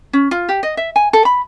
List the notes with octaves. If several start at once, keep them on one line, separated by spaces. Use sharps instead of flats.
C#4
F4
G4
D#5
E5
G#5
A4
B5